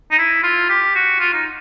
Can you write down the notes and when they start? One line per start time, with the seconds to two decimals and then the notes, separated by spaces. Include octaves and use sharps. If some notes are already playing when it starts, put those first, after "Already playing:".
0.11 D#4
0.18 E4
0.43 F4
0.69 G4
0.95 F#4
1.20 F4
1.33 D#4